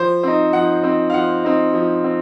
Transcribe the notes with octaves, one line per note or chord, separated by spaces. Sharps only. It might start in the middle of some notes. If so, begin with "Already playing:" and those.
Already playing: F3 C5
C4 D#4
F3 F#5
C4 D#4
F5
F3 F#5
C4 D#4
F3
C4